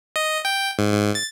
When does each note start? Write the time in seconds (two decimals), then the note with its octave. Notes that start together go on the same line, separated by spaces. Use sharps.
0.16 D#5
0.45 G5
0.79 G#2
0.93 G#2
1.15 A6